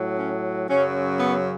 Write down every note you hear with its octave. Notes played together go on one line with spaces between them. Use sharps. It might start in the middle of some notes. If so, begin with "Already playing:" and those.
Already playing: A2 F#3
C#4
F#2 C#3 F#3 C#4
B3